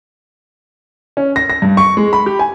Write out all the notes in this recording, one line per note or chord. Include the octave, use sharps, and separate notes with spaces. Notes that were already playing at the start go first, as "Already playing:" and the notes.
C#4
A#6
A#6
G2
C#6
G#3
B5
G4
G#5